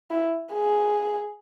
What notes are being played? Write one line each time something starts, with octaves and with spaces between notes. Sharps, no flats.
E4
G#4